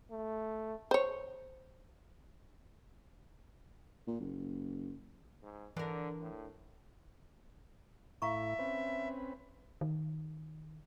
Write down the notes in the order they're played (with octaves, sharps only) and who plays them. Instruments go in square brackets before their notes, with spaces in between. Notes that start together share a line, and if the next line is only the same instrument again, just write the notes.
[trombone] A3
[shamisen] C5 C#5
[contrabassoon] A#2
F#1
[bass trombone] G#2
[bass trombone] D3 [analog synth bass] E3 [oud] D4 A#4
[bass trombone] A2
[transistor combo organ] A2 E4 [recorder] E5 [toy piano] F5 A#5 C#6
[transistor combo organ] C4 C#4 B4
[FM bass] D#3